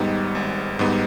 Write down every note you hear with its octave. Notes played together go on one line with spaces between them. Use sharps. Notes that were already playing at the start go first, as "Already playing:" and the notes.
Already playing: G#1 G#2 G3 B3 D#4
G#1
G#2 G3 B3 D#4